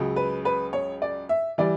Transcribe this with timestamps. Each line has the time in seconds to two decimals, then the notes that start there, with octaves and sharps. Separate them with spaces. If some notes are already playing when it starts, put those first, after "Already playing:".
Already playing: C#2 C#3 F#3
0.16 B4
0.45 B4
0.73 C#5
1.02 D5
1.29 E5
1.58 E3 G3 D5